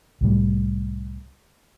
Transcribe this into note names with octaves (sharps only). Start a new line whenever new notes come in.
C2 A2 G3